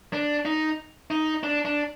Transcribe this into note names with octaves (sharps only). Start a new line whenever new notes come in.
D4
D#4
D#4
D4
D4